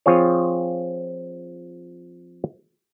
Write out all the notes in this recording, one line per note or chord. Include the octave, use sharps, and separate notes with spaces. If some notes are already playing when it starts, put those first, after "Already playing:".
F3 C4 F4 G#4 C#5